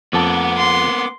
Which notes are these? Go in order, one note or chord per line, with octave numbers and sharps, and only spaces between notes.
F2 A#3 B3 F#5 A5 D6
C6